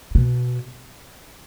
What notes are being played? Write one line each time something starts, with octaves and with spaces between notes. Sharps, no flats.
B2